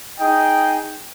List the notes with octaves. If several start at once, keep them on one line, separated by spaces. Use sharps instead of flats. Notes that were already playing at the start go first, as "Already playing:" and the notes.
D#4 G#4 D#5 G5